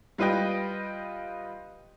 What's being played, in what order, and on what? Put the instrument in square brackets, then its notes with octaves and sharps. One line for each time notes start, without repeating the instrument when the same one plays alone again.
[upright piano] G3 F4 B4 D#5 G5